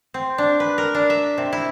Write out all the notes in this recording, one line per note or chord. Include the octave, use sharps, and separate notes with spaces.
C4
D4
B4
A#4
D4
E5
C3
E4